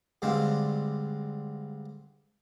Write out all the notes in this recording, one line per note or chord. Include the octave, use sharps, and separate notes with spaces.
G2 D3 G#3 C4 D4 F4